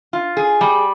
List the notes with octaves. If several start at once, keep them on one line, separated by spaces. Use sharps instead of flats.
F4
G#4
G3